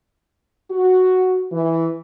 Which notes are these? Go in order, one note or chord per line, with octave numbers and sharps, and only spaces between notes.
F#4
E3